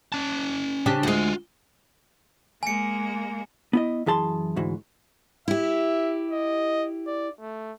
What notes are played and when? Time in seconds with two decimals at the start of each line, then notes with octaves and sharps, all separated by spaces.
0.12 C#4 A5
0.86 C#3 D4 G4
1.03 D2 G#3 F4 F#4
2.63 G#3 A#3 G#5 C#7
3.73 B3 E4 D#5
4.06 F#2 E3 G#4 A5 C6
4.56 D2 G#2 E3 F#4
5.48 E4 G4 E5
6.31 D#5
7.07 D5
7.40 A3